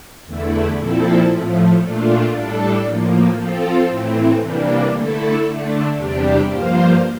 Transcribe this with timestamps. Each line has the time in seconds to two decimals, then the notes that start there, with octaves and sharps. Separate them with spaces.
0.25 E2 D3 A3 E4
0.77 A#2 F3 C4 E4 A4
1.29 A2 F3 A3
1.80 A#2 A3 D4 F4
2.33 A2 G3 D4 A4
2.84 A2 F3 A#3
3.36 F3 C4 F4 A4
3.89 A2 E3 A3 C4
4.40 C3 E3 G3 A#3 D4
4.93 D3 A3 E4 A4
5.45 D3 A3 D4
5.96 E2 C3 G3 D4 G4
6.48 G2 F3 A#3 F4 C5